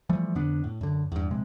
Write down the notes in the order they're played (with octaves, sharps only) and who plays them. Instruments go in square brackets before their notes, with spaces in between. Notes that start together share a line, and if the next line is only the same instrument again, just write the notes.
[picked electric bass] E3 F3 G3 A3
F2 D3 B3 D4
A2
F#2 D3
E2 G2
A#1 C3 G#3